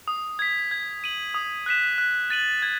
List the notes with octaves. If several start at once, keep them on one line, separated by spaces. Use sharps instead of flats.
D#6
G#6 B6
G#6
D#7 F#7
D#6
F#6 B6 E7
F#6
A6 D#7 F#7
G#6